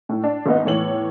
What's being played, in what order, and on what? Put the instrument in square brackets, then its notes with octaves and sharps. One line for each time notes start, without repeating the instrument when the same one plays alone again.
[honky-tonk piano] A2
D4
G#1 B3 D#4
E2 A2 C#5 F#7